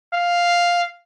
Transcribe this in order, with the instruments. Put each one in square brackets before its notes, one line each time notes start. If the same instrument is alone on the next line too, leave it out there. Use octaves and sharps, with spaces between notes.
[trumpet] F5